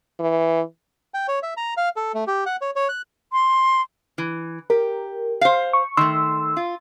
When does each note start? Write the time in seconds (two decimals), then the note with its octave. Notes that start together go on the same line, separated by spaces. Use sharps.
0.19 E3
1.14 G5
1.28 C#5
1.43 E5
1.57 A#5
1.77 F5
1.96 A4
2.14 A3
2.27 G4
2.46 F#5
2.61 C#5
2.76 C#5
2.89 F#6
3.33 C6
4.18 E3
4.70 G4 A#4
5.41 C5 F5
5.73 C#6
5.97 D#3 A3 C6 E6
6.57 F4